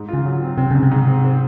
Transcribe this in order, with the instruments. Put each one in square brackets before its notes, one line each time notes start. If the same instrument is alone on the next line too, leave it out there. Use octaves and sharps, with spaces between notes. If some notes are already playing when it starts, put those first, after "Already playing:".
Already playing: [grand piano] G#2
[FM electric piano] C#3 [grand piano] F4
[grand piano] F#3
C4
[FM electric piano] C3 [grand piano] C4
[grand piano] G#2 [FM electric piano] C#3
[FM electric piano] C3
[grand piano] G#2
C4
C4